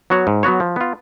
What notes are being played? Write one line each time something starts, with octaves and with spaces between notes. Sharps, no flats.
F#3 B3 F#4 C#5
G#2
F#3 B3 F#4 C#5
F3
B3 F4